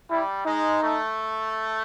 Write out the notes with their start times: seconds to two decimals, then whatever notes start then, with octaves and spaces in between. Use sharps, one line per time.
0.10 G3 E4
0.45 G#3 D#4
0.82 A3